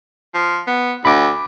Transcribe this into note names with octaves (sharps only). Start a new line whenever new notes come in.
F3
B3
D2 B5 D6